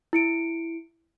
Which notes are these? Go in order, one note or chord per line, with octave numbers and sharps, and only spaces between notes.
E4 C#7 D7